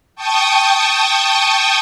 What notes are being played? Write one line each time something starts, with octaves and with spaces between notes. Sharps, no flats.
G5 A5 C#6 D#6